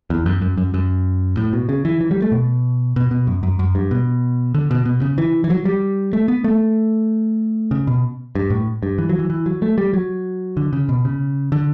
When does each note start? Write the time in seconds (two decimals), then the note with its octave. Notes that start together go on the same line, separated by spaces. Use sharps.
0.10 E2
0.26 F#2
0.42 F#2
0.58 F#2
0.74 F#2
1.37 A2
1.53 B2
1.69 C#3
1.85 E3
2.01 E3
2.11 G3
2.22 A3
2.32 B2
2.96 B2
3.11 B2
3.27 F#2
3.43 F#2
3.59 F#2
3.75 G2
3.91 B2
4.54 D3
4.71 B2
4.85 B2
5.02 C#3
5.18 E3
5.44 E3
5.50 F#3
5.65 G3
6.13 A3
6.28 B3
6.44 A3
7.71 C#3
7.87 B2
8.35 G2
8.50 A2
8.83 G2
8.98 E3
9.09 F#3
9.19 E3
9.30 E3
9.46 F#3
9.62 A3
9.78 G3
9.93 F#3
10.57 D3
10.73 C#3
10.89 B2
11.05 C#3
11.52 D3